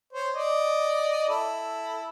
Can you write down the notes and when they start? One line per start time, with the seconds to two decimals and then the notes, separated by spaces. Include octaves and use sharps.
0.13 C5 C#5
0.35 D5 D#5
1.29 E4 A4